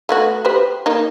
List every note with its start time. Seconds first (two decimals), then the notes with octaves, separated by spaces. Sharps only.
0.09 A3 B3 F#4
0.45 G4 B4 C5
0.86 A#3 D#4